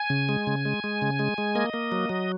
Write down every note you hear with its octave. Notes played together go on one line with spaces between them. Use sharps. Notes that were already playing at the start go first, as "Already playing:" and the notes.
Already playing: G#5
C#3
G#3
C#3
G#3
G#3
C#3
G#3
G#3
A#3 D#5
A#3
F#3
F#3